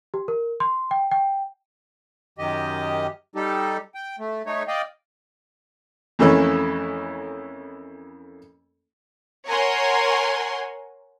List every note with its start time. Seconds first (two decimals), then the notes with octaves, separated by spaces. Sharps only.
0.14 G4
0.28 A#4
0.60 C6
0.91 G5
1.11 G5
2.38 F#2 D#3 G4 D#5
3.35 G3 D#4 G4 A4
3.95 G5
4.19 A3
4.46 A3 D#4 C#5
4.68 D5 D#5 F5 G5
6.19 F2 E3 A3 A#3 C#4 E4
9.47 A#4 C#5 F#5 G#5 C6